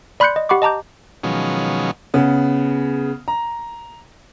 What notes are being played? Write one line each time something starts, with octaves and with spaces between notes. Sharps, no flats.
D5 B5 C6 F#6 G6 C#7
D#5
G4 F#5 B5 C#6 D6
D#5 A5 A#5 D6 G6
B2 D#3 F3 F#3 G#3 C#4
C#3 B3
A#5